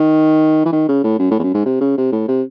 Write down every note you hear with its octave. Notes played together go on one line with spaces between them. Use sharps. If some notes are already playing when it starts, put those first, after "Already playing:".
Already playing: D#3
E3
D#3
C#3
A2
F#2
A2
E2
F#2
G#2
C3
C#3
C3
A2
C3